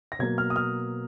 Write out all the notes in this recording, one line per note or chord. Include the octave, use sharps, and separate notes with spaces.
A#6
B2 F#3 A#3 G#6
F6
D#6
F6